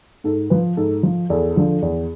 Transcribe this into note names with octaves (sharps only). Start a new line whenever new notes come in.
G#2 A4
F3 B4
G#2 A4
F3
E2 A4
D3 F3
E2